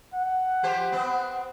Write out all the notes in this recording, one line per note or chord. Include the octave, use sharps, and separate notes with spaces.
F#5
F3 G4 C5
B3 C4